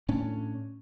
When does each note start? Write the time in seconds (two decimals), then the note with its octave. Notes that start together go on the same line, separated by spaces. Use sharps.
0.08 A2 C#4 D4